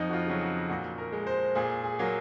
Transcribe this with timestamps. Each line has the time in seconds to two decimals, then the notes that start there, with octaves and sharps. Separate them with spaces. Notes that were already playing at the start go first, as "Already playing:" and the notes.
Already playing: F2 D#4
0.09 F#4
0.13 F4
0.27 C#3 F#3
0.41 F#4
0.69 A#2 F#4
0.98 A#4
1.12 G#3
1.27 C5
1.55 A#2 G#4
1.84 G#4
1.99 F#3 A#3